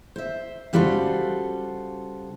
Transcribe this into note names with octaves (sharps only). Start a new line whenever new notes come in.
C5 E5
C#3 G3 F4 F#4 A4 C5